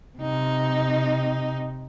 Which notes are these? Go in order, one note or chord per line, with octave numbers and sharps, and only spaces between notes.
C3 D#4